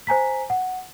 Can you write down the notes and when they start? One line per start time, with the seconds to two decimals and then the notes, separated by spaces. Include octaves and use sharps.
0.07 C5 G#5 A#5 B6
0.50 F#5